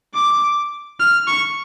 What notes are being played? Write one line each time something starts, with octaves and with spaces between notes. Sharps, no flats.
D6
F6
C#6